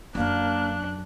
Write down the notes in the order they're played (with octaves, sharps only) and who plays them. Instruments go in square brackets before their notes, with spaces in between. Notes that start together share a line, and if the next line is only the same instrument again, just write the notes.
[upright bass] F#2 F#3 [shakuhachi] A#3 [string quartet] D4 F#6